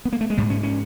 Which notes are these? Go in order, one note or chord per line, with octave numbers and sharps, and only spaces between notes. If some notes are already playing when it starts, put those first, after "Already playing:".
B3
A#3
A3
G#3
G#2 G3
C#4
C#4